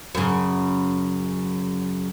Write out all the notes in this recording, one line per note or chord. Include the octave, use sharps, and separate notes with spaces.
F#2 C#3